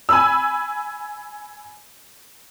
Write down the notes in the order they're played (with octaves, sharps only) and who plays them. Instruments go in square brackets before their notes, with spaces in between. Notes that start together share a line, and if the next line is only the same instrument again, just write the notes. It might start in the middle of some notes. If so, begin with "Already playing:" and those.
[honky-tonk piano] G#5 B5 E6